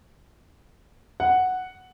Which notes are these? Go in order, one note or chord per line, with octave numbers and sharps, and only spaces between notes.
F#5